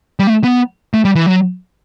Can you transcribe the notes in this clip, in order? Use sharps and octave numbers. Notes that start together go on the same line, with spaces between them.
G3
A3
B3
A3
G3
E3
F#3